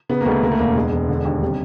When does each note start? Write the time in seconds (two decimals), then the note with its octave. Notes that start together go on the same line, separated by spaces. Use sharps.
0.09 C#3 B3
0.21 A#3
0.26 D2 G#3
0.32 A3
0.42 D2 A#3
0.52 A3
0.59 E1 A#3
0.76 E2 G#3
0.92 E1
1.09 D3
1.25 D#2
1.42 C3 G3